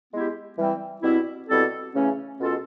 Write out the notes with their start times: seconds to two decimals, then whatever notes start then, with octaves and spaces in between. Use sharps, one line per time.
0.12 G#3 B3 E4 G4
0.57 E3 G3 C4
1.02 B2 G3 C4 E4
1.48 B2 G3 C4 E4 A4
1.94 C#3 E3 A3 C#4
2.39 B2 G#3 C#4 F4 A4